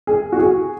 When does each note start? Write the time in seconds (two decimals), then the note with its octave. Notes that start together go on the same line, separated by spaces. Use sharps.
0.07 G#4
0.32 F#4
0.39 G#4